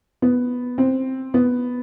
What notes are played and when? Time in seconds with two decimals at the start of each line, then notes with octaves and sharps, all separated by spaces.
0.22 B3
0.78 C4
1.34 B3